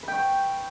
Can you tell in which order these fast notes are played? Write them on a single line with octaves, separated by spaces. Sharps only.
B4 G5 C#6